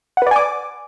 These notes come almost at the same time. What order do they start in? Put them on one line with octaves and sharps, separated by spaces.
F#5 B4 D5 G#5 D6